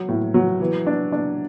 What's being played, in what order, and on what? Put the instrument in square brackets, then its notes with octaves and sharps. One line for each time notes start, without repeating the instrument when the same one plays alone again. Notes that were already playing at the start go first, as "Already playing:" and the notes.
Already playing: [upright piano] F#3
A2
F#3
E3
D4
D4